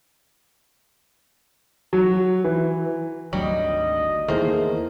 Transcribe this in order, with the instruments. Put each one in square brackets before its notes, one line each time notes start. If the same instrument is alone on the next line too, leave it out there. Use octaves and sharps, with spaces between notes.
[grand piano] F#3
E3
[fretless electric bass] G#1 D2 [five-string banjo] F#3 G3 [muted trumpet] D#5
[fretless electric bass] E2 D#3 A3 [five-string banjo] A#3 C5 [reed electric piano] E4 G#4